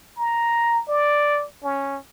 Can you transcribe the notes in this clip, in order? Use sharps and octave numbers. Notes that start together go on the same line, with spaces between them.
A#5
D5
C#4